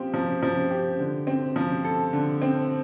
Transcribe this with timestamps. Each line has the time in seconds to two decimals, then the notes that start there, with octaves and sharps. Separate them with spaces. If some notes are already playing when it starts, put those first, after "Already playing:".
Already playing: F3 C4 G4
0.14 F3
0.43 F3
0.70 G4
0.99 D3
1.27 C4
1.56 F3
1.85 A4
2.13 D3
2.42 C4